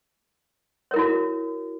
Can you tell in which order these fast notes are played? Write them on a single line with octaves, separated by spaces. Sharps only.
C#5 A#4 E4 F#4